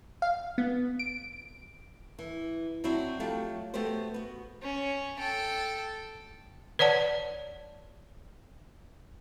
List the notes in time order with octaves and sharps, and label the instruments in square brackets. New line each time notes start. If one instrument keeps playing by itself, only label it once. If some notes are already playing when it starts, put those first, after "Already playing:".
[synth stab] F5
B3
D7
[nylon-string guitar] E3
F#3 C4 D4 E4 F#4
F3 F#3 A3 G4
A3 B3 F#4 G4 C5
B3 F#4
[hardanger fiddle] C#4
A4 G5
[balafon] B4 C#5 D5 F#5 A5